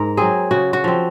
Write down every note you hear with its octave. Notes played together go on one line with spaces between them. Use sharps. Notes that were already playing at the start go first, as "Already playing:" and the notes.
Already playing: G#2 A#4
F#3 C4 G#4
C#3 F#4
F#4
F3 C4